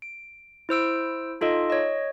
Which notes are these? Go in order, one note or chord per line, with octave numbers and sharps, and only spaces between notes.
D7
E4 C5 E6 D7
D#4 F4 A4 D#5
C#5 D#5